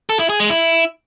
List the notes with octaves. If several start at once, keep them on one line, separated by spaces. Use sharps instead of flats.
A4
E4
G#4
G#3
E4